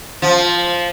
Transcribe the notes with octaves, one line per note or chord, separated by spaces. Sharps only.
F3